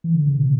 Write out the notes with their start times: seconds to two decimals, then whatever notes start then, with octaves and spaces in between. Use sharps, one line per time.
0.04 E3
0.15 D3
0.27 C#3
0.38 B2